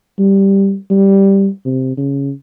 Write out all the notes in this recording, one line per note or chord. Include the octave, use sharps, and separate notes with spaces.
G3
G3
C3
C#3